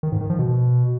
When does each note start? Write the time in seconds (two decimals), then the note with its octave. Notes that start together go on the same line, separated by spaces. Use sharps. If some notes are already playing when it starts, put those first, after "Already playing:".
0.03 D#3
0.12 G#2
0.21 D#3
0.30 F3
0.39 B2